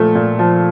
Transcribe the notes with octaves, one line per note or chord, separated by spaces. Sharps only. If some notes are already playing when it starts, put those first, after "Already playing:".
Already playing: A#2 F3 A3
A#2
F3